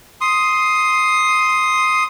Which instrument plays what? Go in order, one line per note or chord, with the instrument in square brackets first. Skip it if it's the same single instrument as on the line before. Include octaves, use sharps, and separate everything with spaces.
[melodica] C6 D#6